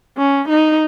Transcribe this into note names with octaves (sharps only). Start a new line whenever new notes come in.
C#4
D#4